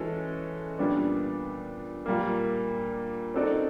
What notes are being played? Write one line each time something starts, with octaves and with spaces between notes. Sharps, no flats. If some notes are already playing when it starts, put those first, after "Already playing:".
Already playing: E3 G#3 C#4 F#4 A4
A#2 G3 B3 D4
A#2 G3 A#3
C4 D#4 F#4 A4 D5